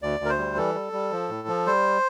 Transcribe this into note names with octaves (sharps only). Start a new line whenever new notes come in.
D2 D5
D2
A#4
C5
G3
E3 A4
G3
G3
F3
A2
F3
G3 C5